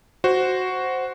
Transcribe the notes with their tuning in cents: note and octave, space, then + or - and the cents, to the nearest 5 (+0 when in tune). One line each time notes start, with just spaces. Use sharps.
F#4 +0 C5 +0